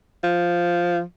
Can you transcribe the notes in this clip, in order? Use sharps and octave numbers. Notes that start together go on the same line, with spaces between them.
F3